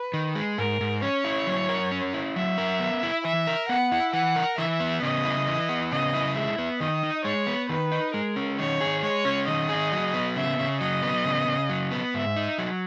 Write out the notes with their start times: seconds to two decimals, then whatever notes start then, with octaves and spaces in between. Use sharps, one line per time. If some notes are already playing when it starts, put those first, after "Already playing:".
Already playing: B4
0.14 D#3
0.35 G#3
0.58 G#2 A#4
0.81 G#2
1.02 C#4 C#5
1.25 E4
1.47 F#3
1.69 A#4
1.92 C#4
2.13 E4
2.36 F#3 E5
2.58 A#4
2.80 B3
3.03 E4
3.24 E3 E5
3.47 A#4
3.69 B3 F#5
3.92 E4
4.13 E3 F#5
4.36 A#4
4.58 E3 E5
4.80 B3
5.03 C#3 D#5
5.24 E4
5.47 E3
5.69 B3
5.92 C#3 D#5
6.14 E4
6.36 G#3 E5
6.58 B3
6.80 D#3 D#5
7.03 D#4
7.24 G#3 C#5
7.47 B3
7.69 D#3 B4
7.92 D#4
8.14 G#3 A#4
8.36 C#4
8.59 D#3 C#5
8.81 G#4
9.03 G#3 C#5
9.25 C#4
9.47 D#3 D#5
9.69 G#4
9.92 F#3
10.14 B3
10.36 C#3 E5
10.59 C#3
10.81 F#3 D#5
11.03 B3
11.25 C#3
11.47 C#3
11.69 F#3
11.92 B3
12.14 G#2 E5
12.36 D#4
12.58 F#3